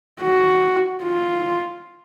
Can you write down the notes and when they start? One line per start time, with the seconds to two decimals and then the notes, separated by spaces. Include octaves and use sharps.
0.21 F#4
1.03 F4